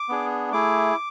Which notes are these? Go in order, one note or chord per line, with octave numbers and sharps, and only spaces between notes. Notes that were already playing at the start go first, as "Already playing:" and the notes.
Already playing: D6
B3 D4 G#4
A3 E4 G#4 D6